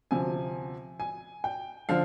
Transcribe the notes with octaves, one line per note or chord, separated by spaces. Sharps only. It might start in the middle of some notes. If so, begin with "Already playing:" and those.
D2 C3 F3 G#5
G#5
G5
D3 F3 F5